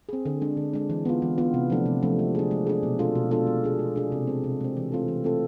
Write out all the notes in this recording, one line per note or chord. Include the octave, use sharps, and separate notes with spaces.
C4 G#4
D3
G#3 D4
D3
G#3 D4
E3
B3 F4
E3
B3 F4
C3
F3 A3 D4
C3
F3 A3 D4
G#3
D4 G#4
G#3
D4 G#4
B2
G#3 D4 F4 A4
B2
G#3 D4 F4 A4
G#3
D4 G#4
G#3
D4 G#4
C3
G#3 C4
C3
G#3 C4
E3
A3 C4 F4 A4
E3
A3 C4 F4 A4